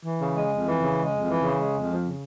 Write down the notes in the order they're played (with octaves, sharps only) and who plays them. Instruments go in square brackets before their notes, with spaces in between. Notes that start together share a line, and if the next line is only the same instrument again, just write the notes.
[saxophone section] E3
C#3
G#3
F2
E3
C#3
G#3
F2
E3
C#3
G#3
F2
F3
C#3